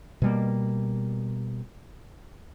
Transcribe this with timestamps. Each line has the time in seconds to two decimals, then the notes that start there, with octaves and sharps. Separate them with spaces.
0.22 B2 G3 A#3